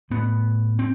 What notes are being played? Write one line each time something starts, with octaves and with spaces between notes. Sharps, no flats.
A2 B3
C4